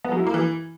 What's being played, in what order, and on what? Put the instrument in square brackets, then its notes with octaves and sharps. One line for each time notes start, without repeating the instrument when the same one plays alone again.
[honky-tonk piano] B3
F#3
E4
A#3
E3